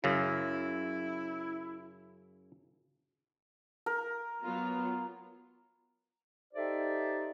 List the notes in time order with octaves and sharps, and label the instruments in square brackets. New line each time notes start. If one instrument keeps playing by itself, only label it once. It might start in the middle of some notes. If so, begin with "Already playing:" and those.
[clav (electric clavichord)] F#2 C#3 [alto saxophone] E4
[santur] A#4
[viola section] F#3 B3 F4
[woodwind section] D#4 G4 A4 C5 D5 E5